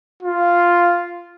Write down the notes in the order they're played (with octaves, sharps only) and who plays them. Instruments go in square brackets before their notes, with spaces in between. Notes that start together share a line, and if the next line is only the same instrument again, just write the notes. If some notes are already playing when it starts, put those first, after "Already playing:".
[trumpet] F4